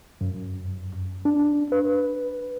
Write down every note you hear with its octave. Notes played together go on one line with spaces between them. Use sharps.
F#2
D4
B4